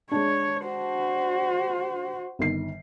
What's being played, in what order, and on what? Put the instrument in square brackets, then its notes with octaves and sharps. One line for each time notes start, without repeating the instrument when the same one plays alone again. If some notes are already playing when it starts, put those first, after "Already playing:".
[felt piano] G#3 D4 [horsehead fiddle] C#5
[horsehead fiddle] F#4 C5
[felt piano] G1 D#3 C7